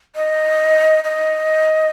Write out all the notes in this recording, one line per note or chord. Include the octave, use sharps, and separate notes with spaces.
D#5
D#5